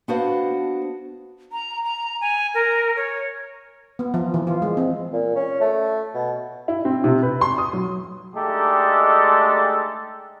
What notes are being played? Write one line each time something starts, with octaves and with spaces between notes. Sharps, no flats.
B3 D4 F#4 B4 C5 F5
A#5
A#5
G#5
A#4
C#5
B3
F3
E3
F4
G#3
C4
A#2
C#4
A3
B2
E4
C4
C3
B4
C6
D#6
F#3
G#3 A3 D4 D#4 G4 A4